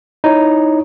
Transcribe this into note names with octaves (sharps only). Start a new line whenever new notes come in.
D#4 E4 C#5